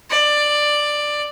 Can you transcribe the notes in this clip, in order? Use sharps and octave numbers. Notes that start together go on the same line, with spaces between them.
D5